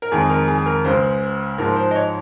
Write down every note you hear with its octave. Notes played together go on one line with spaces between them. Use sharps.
A#4
F2 D#3 G#3 G#4
A#4
G#4
G#4
A#4
C#2 C#3 G#3 C5
G#2 F3 G#3 A#4
C5
D#5
C#5